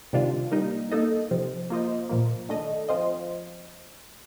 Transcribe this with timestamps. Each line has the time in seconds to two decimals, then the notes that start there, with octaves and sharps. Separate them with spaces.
0.13 C3 D#3 G3 D4 F4
0.52 G3 A#3 D#4
0.92 A#3 D#4 A4 D#5
1.31 C3 F3 C4
1.70 A#3 F4 C5 D#5
2.09 A#2 F3 A#3
2.49 D#3 A3 D4 A4 D#5
2.89 F3 C4 F4 C5 D#5